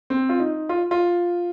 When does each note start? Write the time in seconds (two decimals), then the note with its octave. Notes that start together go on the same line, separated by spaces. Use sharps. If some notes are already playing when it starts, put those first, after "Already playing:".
0.10 C4
0.29 F4
0.40 D#4
0.69 F4
0.91 F4